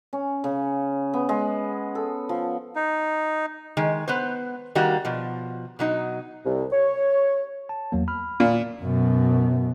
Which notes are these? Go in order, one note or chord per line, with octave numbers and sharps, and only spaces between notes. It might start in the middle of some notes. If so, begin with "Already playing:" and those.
C#4
C#3
B3
G#3
A4
F3
D#4
D#3 G#3
B3 B4 C5
D#3 G3 A#3 F#4
B2 F3
B2 F#3 D#4
C2
C#5
A5
E2 F#3 A#3
B5 F6
A#2
F#2 B2